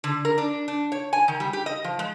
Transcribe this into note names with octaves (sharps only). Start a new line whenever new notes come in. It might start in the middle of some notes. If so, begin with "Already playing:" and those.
D3
A#4
D4
D4
C#5
G#5
D#3
G3
G4
D#5
F3
G#3